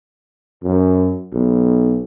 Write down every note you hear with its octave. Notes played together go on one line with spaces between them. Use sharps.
F#2
B1